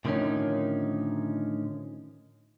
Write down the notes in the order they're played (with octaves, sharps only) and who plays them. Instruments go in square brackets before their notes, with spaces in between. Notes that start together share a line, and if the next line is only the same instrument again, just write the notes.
[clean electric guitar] A2 D3 D#3 F3 C#4 D#4